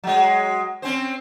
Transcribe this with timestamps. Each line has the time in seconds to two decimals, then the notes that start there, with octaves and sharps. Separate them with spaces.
0.04 F#3 G#3
0.82 C4 C#4 C5